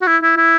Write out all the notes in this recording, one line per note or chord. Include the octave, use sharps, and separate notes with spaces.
F#4
E4
E4
E4